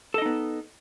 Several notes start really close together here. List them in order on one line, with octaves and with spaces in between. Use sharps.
A4 D#5 D#4 B3